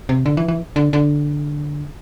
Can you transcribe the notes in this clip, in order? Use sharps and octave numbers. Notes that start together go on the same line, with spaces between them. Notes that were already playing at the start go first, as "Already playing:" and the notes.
C3
D3
E3
E3
D3
D3